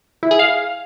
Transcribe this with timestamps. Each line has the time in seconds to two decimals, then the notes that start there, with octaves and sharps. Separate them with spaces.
0.23 E4
0.31 G#4
0.39 F5